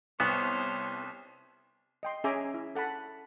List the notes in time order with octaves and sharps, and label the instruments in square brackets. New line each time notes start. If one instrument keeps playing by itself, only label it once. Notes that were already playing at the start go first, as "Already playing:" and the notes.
[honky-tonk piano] C2 [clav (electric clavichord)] B3 [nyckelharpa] C5 C#5
[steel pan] D#5 G5 C6
C#4 G#4 E5 G#5 A#5 D6
E4
A4 F#5 A5 B5